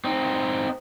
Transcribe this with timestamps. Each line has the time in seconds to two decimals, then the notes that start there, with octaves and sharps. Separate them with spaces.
0.04 C4 D#4